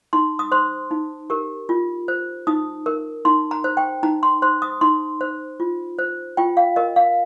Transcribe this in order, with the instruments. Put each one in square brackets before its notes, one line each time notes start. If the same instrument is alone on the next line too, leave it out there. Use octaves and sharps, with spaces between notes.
[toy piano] D#4 C6
D#6
C5 C6
D#4
G4 A#4
F4
C5
D#4 D#6
A#4
D#4 C6
A#5
C5
G5
D#4 A#5
C6
C5 C6
D#6
D#4 C6
C5
F4
C5
F4 G5
F5
A#4 D#5
F5